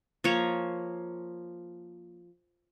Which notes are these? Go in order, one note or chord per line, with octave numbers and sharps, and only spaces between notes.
F3 A#3 C#5 A#5